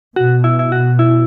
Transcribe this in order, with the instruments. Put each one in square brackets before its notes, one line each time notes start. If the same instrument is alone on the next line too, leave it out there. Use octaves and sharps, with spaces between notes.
[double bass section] B2 [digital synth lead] F#4
[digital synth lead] E4
E4
F#4
E4